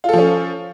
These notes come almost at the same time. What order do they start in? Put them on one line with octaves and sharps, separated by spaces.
F4 A4 F3 C#4